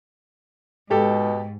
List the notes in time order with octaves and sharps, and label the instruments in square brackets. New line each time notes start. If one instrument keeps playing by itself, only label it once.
[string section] G#2 [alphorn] B2 [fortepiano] G4 A4